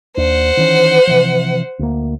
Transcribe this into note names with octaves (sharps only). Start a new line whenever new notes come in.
D#2 D4 C5 F#5
D#3 E3 C#4
C3 E3 F3
D2 A#3